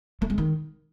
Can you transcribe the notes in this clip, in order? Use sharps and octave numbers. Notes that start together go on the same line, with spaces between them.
A3
G#3
D#3